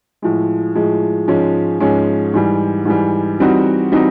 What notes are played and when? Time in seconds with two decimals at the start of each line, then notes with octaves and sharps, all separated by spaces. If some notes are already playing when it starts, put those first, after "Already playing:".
0.22 A2 F3 G#3
0.75 A2 F3 G#3
1.28 G#2 F3 G#3 C#4
1.80 G#2 F3 G#3 C#4
2.34 G#2 E3 G3
2.85 G#2 E3 G3
3.39 E3 G3 C4 D#4 F#4
3.92 E3 G3 C4 D#4 F#4